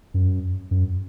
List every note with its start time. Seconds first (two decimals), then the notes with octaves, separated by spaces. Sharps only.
0.14 F#2
0.71 F#2